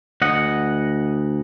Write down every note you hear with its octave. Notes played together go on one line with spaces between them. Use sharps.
D2 D#5 F#5